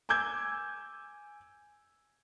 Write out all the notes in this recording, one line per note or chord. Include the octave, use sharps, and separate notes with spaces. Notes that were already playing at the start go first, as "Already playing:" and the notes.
G#5 D6 E6 G6 G#6